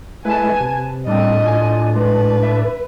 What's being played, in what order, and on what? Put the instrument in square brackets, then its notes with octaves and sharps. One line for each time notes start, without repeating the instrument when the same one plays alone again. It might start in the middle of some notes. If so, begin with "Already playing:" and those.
[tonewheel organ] G#3 A3 E4 [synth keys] B4 A5 [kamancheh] G#5
[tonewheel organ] C3
[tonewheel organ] A2 D4 [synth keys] G3 C4 [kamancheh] D#5
[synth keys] F4 G#5
[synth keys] G#3 [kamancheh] B4
[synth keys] E5